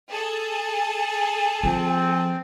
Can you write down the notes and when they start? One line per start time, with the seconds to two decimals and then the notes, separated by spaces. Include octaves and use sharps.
0.10 G#4 A4 A5
1.63 F3 C4